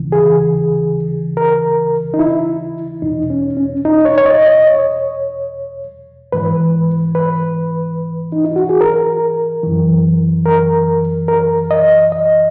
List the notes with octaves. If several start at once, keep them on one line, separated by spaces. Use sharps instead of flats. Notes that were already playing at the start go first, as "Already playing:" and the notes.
Already playing: D#2 C#3 E3
G#4
A#4
D#4
E4
E2 B2 D#4
C#4
C#4
D#4
C#5
C#5
D#5
D#5
C#5
G#2 E3 B4
B4
D#4
E4
F#4
G#4
A#4
F#2 E3
A#4
A#4
D#5
D#5